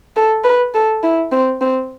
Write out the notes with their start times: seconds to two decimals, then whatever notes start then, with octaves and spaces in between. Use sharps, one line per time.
0.16 A4
0.44 B4
0.74 A4
1.03 E4
1.32 C4
1.61 C4